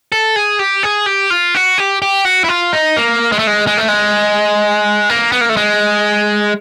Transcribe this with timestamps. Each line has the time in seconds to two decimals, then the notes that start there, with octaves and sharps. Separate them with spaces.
0.12 A4
0.36 G#4
0.59 G4
0.83 G#4
1.06 G4
1.30 F4
1.55 F#4
1.78 G4
2.02 G4
2.25 F#4
2.44 E4
2.49 F4
2.73 D#4
2.97 A#3
3.32 G#3
3.39 A3
3.47 G#3
3.67 G#3
3.77 A3
3.88 G#3
5.10 A#3
5.32 B3
5.41 A#3
5.49 A3
5.57 G#3